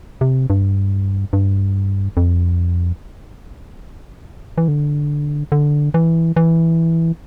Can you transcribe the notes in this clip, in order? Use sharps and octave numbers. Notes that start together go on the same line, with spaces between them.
C3
G2
G2
F2
E3
D3
D3
E3
E3